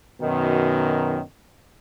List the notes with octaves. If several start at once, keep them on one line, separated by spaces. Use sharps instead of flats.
F#2 B2 D#3